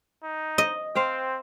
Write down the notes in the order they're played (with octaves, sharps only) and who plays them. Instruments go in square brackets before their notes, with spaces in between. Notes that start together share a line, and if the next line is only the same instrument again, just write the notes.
[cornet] D#4
[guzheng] D#5
[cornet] C4 [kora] C5 F5 G5